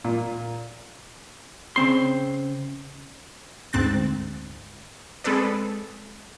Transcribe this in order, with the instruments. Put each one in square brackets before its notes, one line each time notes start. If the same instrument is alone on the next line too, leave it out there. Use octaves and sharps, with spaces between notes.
[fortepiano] A#2
[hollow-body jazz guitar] C#3 C4 C6
[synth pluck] D2 G#2 C4 F#6 A6
G#3 C4 G#4 A4 B4 D5